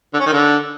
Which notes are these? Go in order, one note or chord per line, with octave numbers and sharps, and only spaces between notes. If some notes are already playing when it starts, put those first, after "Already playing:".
D3
C#4
D#3
D3